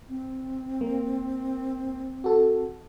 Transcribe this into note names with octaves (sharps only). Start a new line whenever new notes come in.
C4
A#3
F#4 A4